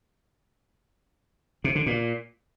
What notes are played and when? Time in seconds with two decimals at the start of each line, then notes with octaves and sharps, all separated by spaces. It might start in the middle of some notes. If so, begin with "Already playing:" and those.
1.64 C3
1.75 D3
1.86 A#2